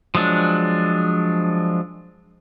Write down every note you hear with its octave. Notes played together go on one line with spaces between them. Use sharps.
F3 F#3 G#3 D4